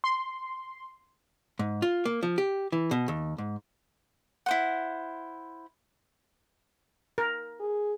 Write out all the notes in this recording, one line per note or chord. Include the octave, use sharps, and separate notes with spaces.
C6
G#2
F4
A#3
F3
G4
E3
B2
D#2
G#2
E4 C5 F#5
A#4
G#4